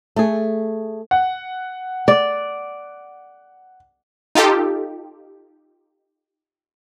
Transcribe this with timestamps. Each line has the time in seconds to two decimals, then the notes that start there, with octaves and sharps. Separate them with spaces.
0.16 A3 G#4
1.11 F#5
2.08 D5
4.35 D#4 F4 G4 A4